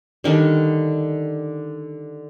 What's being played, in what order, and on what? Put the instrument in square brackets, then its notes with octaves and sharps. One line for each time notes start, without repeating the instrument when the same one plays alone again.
[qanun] D3 D#3 G3 D4